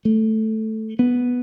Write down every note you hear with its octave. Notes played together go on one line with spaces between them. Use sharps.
A3
B3